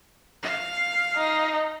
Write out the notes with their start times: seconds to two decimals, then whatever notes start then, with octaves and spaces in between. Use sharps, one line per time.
0.43 F5
1.16 D#4